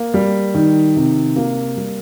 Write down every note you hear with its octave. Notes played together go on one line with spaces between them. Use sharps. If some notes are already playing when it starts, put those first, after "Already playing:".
Already playing: A#3
G3
D#3
C3
A#3
G3